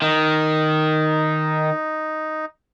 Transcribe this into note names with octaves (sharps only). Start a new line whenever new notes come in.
D#3 D#4